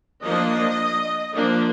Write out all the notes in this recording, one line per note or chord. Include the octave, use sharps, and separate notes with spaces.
F3 A#3 D4 D#5
F3 A#3 D4